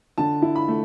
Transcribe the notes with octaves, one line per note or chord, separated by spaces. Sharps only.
D3 A5
E4
B5
A3